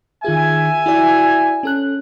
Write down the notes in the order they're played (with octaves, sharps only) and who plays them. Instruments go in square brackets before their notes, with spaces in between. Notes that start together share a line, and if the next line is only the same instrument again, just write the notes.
[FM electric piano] D#3 F4 G#4 [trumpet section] E5 G#5
[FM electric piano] E4 F#4 D5
C#4 A4 F#6